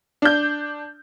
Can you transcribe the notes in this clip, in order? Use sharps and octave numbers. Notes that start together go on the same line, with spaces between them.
D4 G6